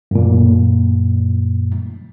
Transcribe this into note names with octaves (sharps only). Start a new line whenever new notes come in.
F#2 A#2